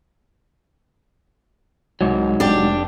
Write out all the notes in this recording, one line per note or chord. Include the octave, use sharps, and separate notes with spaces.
C2 G#2 F#3
F1 D4 G4